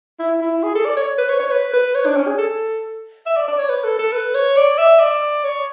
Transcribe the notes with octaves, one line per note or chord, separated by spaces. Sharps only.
E4
E4
G#4
A4
D5
C#5
B4
C#5
C#5
B4
B4
C#5
D4
C#4
G#4
A4
E5
D5
D5
C#5
B4
A4
A4
B4
C#5
D5
E5
D5
C#5